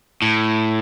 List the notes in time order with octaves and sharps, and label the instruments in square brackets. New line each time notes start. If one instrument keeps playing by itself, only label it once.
[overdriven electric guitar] A2